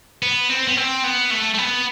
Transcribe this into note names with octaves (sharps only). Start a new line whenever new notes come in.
B3
C4
B3
C4
B3
A3
A3
B3